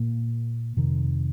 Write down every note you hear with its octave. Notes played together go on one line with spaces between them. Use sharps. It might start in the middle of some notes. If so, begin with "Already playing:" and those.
Already playing: A#2 A#3
F2 C3 D#3